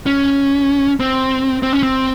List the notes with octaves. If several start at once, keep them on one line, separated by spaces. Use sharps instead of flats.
C#4
C4
C4
C#4
C4